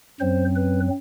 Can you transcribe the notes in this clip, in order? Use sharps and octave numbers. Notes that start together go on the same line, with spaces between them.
F#2 F#3 C4 C5
B4